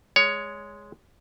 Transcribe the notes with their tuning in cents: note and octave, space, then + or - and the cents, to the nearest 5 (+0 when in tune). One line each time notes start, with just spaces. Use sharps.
G#3 +0 C#5 +15